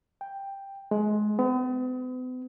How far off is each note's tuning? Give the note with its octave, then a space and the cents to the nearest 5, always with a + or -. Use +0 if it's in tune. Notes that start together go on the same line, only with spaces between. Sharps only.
G5 +5
G#3 +25
B3 +45